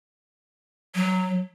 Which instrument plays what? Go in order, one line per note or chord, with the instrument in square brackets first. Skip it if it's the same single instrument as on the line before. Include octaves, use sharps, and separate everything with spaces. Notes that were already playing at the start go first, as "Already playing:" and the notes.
[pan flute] F#3